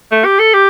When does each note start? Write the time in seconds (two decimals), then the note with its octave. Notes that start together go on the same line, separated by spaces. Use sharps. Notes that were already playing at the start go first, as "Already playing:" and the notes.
0.11 A3
0.25 G4
0.39 A4
0.54 G4